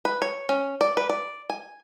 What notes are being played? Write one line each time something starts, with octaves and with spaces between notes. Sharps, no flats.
B4
C#5
C#4
D5
B4
D5
G#5